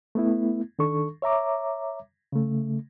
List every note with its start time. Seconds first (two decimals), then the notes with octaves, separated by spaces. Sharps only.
0.15 A3 B3 E4
0.79 D#3 D4 A4 C#6
1.22 C#5 E5 A#5 D6
2.32 C#3 A3